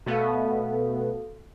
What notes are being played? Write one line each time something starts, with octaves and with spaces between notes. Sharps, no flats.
B2 A3 B3 F#4 A4 F5